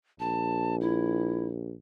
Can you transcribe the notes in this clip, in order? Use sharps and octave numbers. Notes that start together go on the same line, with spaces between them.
A#1 A5
E4